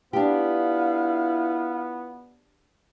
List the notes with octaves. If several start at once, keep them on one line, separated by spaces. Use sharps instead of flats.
B3 D4 E4 F4 G4 F5 F6